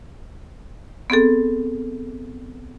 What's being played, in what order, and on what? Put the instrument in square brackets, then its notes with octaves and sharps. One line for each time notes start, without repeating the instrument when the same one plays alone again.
[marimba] B3 C4 G#4 A4